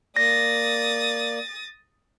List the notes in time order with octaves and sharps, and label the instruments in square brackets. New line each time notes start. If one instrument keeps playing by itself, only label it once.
[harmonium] A#3 D5 [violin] D#6 A6 [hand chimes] A#6